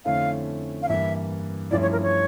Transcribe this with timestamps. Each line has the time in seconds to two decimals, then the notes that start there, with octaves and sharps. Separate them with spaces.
0.05 F2 D3 A3 C#4 E4 F5
0.82 F5
0.88 G2 E3 A#3 E4 E5
1.71 G2 F3 A3 C#4 E4 D5
1.82 C#5
1.92 A#4
2.02 C#5